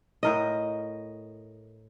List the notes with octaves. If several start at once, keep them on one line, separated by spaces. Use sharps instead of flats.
A2 A#4 D#5